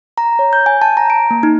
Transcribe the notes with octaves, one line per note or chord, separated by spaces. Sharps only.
A#5
C#5
G6
G#5
A5
A#5
D7
A#3
D#4